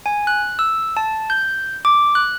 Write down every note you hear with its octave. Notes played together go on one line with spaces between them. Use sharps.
G#5
F#6
E6
A5
G6
D6
F#6